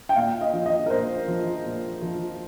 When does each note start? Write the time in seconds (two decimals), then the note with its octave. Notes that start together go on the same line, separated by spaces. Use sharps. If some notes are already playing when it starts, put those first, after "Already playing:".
0.09 G5
0.16 A#2 F5
0.41 D#5
0.53 F3
0.66 D#5
0.86 A#4
0.90 A#2 C5
1.28 F3
1.65 A#2
2.02 F3